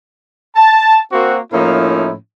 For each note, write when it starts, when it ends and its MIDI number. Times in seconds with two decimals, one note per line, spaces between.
0.56 0.98 81
1.12 1.39 58
1.12 1.39 60
1.12 1.39 66
1.53 2.12 45
1.53 2.12 53
1.53 2.12 58
1.53 2.12 61
1.53 2.12 63
1.53 2.12 64